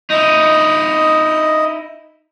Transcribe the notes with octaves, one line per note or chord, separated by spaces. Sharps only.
D#4 E4 D#5